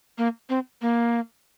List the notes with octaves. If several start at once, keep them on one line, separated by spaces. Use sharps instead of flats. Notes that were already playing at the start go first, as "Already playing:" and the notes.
A#3
C4
A#3